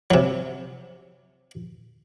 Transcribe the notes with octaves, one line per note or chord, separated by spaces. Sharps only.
C3 F#3